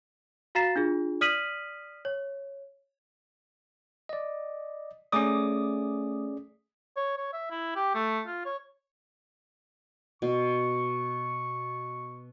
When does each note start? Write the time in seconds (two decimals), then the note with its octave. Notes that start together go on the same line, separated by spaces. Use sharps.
0.55 F#4 F5 A#5 A6 C7 E7
0.76 D4 F4 G#4
1.21 D5 D#6 F6 B6 D#7 F#7
2.05 C#5
4.09 D5 D#5
5.12 A3 C#4 G#4 D5 D6 D#6
6.96 C#5
7.18 C#5
7.33 E5
7.50 E4
7.76 G4
7.94 A3
8.27 F4
8.45 C#5
10.22 B2 C#6